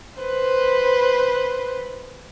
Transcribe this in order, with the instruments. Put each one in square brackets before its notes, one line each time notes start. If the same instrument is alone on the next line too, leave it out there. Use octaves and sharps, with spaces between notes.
[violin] B4 C5